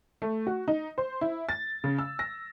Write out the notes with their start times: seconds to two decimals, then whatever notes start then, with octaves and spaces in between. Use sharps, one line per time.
0.22 A3
0.47 F#4
0.68 D#4
0.98 C5
1.21 E4
1.49 A6
1.84 C#3
1.99 E6
2.19 A#6